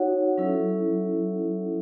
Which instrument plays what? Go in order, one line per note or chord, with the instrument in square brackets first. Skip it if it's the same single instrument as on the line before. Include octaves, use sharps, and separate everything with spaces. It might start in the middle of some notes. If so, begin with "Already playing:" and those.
Already playing: [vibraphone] D#4 F#4 C#5 F#5
F#3 C#4 E4 A4 E5